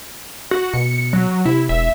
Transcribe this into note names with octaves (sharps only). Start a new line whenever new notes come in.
F#4
B2 C#7
F#3
C3 E4
E1 E5